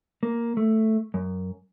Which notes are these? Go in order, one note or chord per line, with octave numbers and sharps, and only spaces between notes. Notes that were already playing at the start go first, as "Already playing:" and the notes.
A#3
A3
F#2